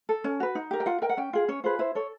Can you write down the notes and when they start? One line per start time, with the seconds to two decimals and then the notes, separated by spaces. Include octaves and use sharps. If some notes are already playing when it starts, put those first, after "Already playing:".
0.09 A4
0.24 C#4
0.40 F#4 B4
0.55 D#4
0.71 G4 A#4
0.80 G5
0.86 F4 F#5
1.02 A#4 G5
1.09 F#5
1.17 C#4 G5
1.33 F4 G#4
1.48 C#4 C#5
1.64 F4 G#4 B4 C5
1.79 E4 C5
1.95 A4 C#5